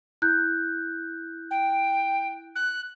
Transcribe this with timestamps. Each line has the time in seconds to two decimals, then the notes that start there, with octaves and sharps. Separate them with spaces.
0.22 E4 F#6 G6
1.51 G5
2.56 F#6